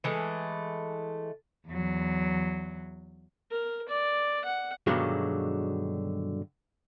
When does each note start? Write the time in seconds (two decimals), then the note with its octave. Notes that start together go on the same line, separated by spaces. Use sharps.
0.04 E3 G#3 A3
1.68 E2 F#3
3.51 A#4
3.89 D5
4.45 F#5
4.87 G2 B2 D3 D#3 F#3 G#3